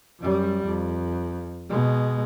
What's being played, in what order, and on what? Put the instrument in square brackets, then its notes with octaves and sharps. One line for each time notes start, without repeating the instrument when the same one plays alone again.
[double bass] F#2 G3
F2
B2 G#3